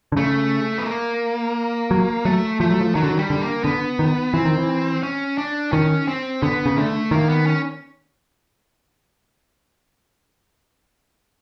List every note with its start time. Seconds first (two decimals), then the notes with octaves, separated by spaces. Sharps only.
0.12 D3
0.16 C#3 A3
0.78 B3
0.86 A#3
1.91 F#3
2.25 F#3 A3
2.60 F3 A3
2.70 F#3
2.81 F3
2.95 D#3 F#3
3.03 D3
3.11 D#3
3.19 G3
3.30 D3
3.42 A#3
3.64 D3 B3
3.99 D#3
4.34 E3 C4
4.45 D#3
4.58 E3
5.03 C#4
5.38 D4
5.72 D#3 C#4
6.08 C4
6.43 D3 B3
6.66 C#3
6.77 D3 A3
7.11 D#3 A#3
7.29 B3
7.46 C#4